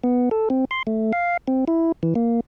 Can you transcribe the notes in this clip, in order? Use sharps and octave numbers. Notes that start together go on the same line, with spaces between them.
B3
A4
C4
C6
A3
F5
C4
E4
E3
A#3